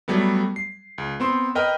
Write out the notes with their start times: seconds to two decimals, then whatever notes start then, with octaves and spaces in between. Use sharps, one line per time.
0.08 F#3 G3 A3 B3
0.56 C7
0.98 C#2
1.20 B3 C4 C6
1.55 A#4 B4 D#5 G5 F6